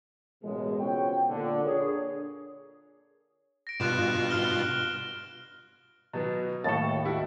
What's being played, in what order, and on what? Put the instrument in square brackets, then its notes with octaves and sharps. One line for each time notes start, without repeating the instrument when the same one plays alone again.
[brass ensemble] A1 F#2 B2 G#3
C#2 B2 C4 C#5 F#5 G5
A#2 D3
D4 G#4 A#4 C#5
[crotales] A#6 D7
[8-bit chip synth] G2 B2 F4 [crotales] F#6 E7
[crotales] F6 G7
[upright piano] B2 F#3 B3
[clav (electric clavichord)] D#2 A2 A4 [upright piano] C#6 A6
[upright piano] G3 E4 F#4